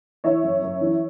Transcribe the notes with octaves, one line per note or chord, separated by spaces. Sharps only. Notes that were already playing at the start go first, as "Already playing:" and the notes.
E3 C#5 E5
F#2
F#2
E3